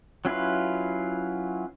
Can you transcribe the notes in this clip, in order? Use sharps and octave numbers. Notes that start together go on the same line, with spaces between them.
F#3 C#4 E4 F4 B4